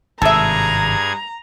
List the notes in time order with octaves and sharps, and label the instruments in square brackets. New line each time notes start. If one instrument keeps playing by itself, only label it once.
[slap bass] G#1 C3 [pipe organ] G2 G#4 G#6 [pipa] A4 E5 [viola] A#5